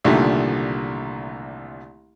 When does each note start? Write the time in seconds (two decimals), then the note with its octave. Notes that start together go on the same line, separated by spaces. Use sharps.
0.04 C2 A#2 D3 D#3 A3